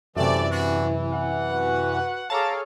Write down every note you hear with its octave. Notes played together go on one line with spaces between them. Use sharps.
F#2 C3 E3 A3 D5 E5
D4 E4 F#4
F#5
F#4 B4
G#4 A4 C#5 F5 A5 A#5 D6